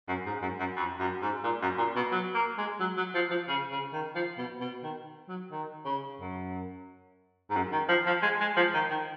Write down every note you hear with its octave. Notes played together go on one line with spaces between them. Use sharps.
F#2
G#2
F#2
F#2
F2
F#2
G#2
A#2
F#2
A#2
B2
F#3
A#3
G#3
F#3
F#3
F3
F3
C#3
C#3
D#3
F3
B2
B2
D#3
F#3
D#3
C#3
F#2
G#2
F#2
D#3
F3
F3
G#3
G#3
F3
D#3
D#3